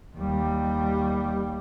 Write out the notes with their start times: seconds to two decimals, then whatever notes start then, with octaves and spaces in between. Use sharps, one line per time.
0.16 D#2 G3